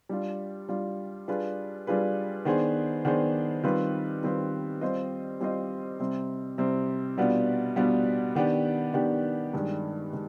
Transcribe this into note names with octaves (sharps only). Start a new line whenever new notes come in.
G3 D4 F4
G3 D4 F4
G3 D4 F4 G#4 B4
G3 D4 F4 G#4 B4
D#3 B3 D4 G#4 C5
D#3 B3 D4 G#4 C5
D#3 G3 C4 F4 B4
D#3 G3 C4 F4 B4
G3 C4 F4 C5 D#5
G3 C4 F4 C5 D#5
C3 G3 C4
C3 G3 C4
B2 G3 B3 D4 F4
B2 G3 B3 D4 F4
D#3 B3 D4 G4
D#3 B3 D4 G4
G2 D#3 G#3 D4
D#3 G#3